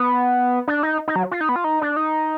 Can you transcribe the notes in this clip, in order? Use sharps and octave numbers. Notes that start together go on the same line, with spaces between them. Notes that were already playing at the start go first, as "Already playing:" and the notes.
Already playing: B3
D4
D#4
D#4
F#3
F4
D#4
B3
F4
D#4
D4
D#4